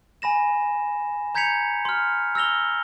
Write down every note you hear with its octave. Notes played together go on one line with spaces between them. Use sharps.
G#5 B5 A#6 E7
A#5 G6 G#6 B6 C#7 F7
C6 F6
E6 F6 A#6 F7 G7